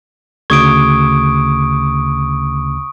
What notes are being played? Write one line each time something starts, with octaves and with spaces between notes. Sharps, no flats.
D2 C#3 C#6 D#6 G#6 D7